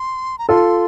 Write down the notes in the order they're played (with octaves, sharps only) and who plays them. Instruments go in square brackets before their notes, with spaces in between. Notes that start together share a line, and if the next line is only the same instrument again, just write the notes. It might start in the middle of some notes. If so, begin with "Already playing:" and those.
Already playing: [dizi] C6
A#5
[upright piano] F4 A4 [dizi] C6